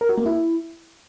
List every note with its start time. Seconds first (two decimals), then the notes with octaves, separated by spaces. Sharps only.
0.01 A#4
0.09 F#4
0.18 A#3
0.26 E4